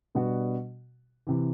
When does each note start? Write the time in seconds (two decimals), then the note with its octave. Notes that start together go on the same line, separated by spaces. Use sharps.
0.15 B2 G3 B3 D4 F#4
1.27 C3 E3